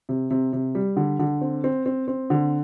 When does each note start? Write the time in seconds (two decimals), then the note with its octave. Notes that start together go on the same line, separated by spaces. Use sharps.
0.09 C3
0.31 C3
0.53 C3
0.75 G3
0.97 D3
1.19 D3
1.41 C4
1.64 C4
1.86 C4
2.08 C4
2.30 D3